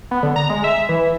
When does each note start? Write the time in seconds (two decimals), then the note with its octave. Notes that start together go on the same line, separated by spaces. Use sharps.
0.11 B3
0.23 D3
0.36 A#5
0.50 G#3
0.64 E5
0.89 E3